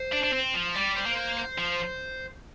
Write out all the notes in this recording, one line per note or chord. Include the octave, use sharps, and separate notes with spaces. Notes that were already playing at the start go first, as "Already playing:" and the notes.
Already playing: C5
D4
D4
C4
F3
G3 D5
C5
A#3
C5
C5
F3